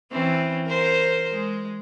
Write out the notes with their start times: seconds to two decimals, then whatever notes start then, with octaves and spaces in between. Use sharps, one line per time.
0.11 E3 C4 C#4
0.67 A#4 C5
1.32 G#3